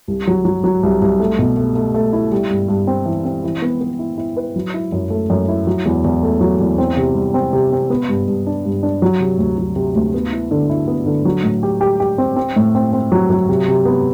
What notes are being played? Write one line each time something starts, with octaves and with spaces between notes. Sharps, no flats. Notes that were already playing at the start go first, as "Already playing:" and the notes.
C2
F#3
F#3
F#3
C2
C2
A3
B2
A3
A3
A3
E4
G3
G2
G2
C4
E3
C4
E3
B3
B3
E4
E4
B4
F#3
E4
F#2
A3
F#2
E4
F#3
E2
E2
A3
F#3
E2
C4
C3
G3
C4
C3
C4
B3
G2
G2
D4
G2
D4
F#3
C3
D2
F#3
C3
D2
B3
E4
D3
E4
B3
D3
F#3
A2
G4
G4
G4
C4
C4
A2
C4
C4
F#3
F#3
C3
C3
B3